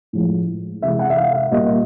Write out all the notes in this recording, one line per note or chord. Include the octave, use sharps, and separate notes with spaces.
A2 F3 G#3
C3 E3 G#3 E5
F#5
E5
F5
E5
A#2 G3 A#3 D#5